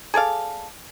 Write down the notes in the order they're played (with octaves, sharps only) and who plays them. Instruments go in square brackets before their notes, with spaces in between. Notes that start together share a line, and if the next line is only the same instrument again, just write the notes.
[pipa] G#4 A4 D5 F5